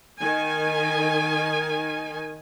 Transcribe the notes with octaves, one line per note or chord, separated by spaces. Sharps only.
D#3 G#5